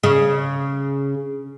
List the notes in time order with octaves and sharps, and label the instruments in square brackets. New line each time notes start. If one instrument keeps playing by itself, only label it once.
[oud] C#3